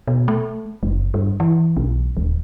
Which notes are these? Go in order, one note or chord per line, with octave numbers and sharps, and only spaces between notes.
B2
A3
F#1
G2
E3
B1
D#1